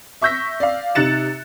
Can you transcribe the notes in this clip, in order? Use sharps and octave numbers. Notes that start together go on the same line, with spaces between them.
E5 C#6 E6 G6 A#6 B6
D5 F5
C3 D#4 F#6 A6 C#7 E7